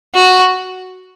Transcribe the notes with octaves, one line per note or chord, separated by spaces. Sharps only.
F#4